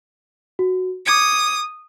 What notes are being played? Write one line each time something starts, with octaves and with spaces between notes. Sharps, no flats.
F#4
D6 D#6 G#6 C#7